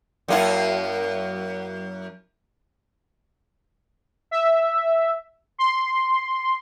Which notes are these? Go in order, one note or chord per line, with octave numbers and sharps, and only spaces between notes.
F#2 A#3 E4
E5
C6